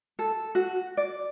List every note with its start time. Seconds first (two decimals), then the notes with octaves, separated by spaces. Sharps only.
0.19 A4
0.55 F#4
0.97 D5